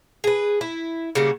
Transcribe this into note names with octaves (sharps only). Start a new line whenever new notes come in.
G#4 B4
E4
C#3 G3 A#3 F#4